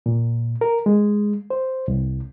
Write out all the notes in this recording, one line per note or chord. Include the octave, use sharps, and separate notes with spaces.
A#2
A#4
G#3
C5
C2